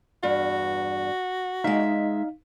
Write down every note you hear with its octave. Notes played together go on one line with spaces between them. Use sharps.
E2 G2 F#4
G#3 D#4 E5 F5